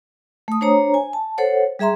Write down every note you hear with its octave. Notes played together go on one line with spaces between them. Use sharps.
A3 D#6
D4 C5 C#5 A#5
G#5
A5
A4 C5 C#5 F#5
G3 G#4 E5 A#5 C6